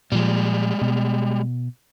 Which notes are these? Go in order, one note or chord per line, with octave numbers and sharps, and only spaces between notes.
A#2 F3 G3 G#3
B2